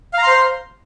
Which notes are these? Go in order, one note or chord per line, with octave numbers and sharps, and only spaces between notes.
C5 F5 A#5 C6